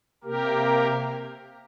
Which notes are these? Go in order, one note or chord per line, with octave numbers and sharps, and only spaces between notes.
C3 A#3 G4 A#4